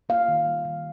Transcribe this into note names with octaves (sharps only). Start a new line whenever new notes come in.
A#3 F5
D#3
G3
D#3